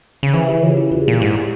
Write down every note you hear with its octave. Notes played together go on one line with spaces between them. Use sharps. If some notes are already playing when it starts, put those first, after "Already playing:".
C#3
E3 G#4 C5
E4 G4
C#3 C#4 F4
E4 G4
E2 F4 G#4
A#2
G#2 E4 G4